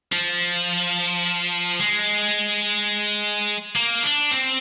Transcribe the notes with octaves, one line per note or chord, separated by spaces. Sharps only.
F3
G#3
A#3
D4
C4